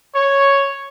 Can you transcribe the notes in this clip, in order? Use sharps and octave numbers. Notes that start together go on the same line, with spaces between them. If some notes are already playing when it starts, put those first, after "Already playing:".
C#5